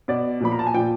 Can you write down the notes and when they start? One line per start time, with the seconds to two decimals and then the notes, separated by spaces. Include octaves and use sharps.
0.08 B2 D5
0.40 A#2 F3 B5
0.52 A#5
0.59 A5
0.67 G#5
0.74 A#2 F3 G5